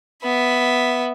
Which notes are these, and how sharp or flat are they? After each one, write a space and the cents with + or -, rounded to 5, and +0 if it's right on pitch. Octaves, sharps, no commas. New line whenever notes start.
B3 +0 E5 +0